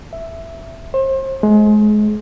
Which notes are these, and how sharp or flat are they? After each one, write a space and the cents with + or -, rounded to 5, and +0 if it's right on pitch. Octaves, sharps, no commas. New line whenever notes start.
E5 +5
C5 +35
G#3 +30